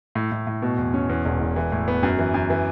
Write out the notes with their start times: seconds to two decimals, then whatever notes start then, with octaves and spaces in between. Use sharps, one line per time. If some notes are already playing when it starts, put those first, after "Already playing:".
0.15 A2
0.32 A2
0.47 A2
0.62 B2
0.78 E2
0.94 C#4
1.09 E2
1.25 E1
1.40 E1
1.56 E3
1.72 A2
1.88 B3
2.03 F#2
2.19 E3
2.34 F#2
2.50 E3